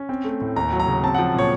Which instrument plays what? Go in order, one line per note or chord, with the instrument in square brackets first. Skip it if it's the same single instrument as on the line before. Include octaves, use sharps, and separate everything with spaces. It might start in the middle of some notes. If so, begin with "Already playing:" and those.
Already playing: [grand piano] C#4
C4
A3
A2
D#2 A#5
F#3
A#5
C#3
C4 A5
F3 F#5
A#2 C#5